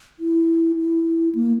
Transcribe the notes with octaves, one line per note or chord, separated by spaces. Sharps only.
E4
E4
A#3